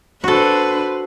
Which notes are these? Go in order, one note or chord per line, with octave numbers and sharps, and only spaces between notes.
D4 F#4 A4 B4 C5